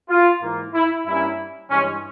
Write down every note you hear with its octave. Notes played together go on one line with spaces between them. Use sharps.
F4
G#2 E3 A#3
E4
G2 G3 A#3 C#4 E4
G2 E3 G#3 C#4